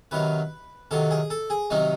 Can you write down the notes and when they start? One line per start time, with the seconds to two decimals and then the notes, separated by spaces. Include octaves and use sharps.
0.11 C3 D#3 F#3 B4
0.91 C3 D#3 F#3 A4
1.11 G#4
1.30 A4
1.50 G#4
1.70 C3 D#3 F#3 D#4